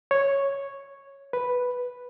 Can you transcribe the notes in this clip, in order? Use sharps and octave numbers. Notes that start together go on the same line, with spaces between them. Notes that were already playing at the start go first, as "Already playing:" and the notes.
C#5
B4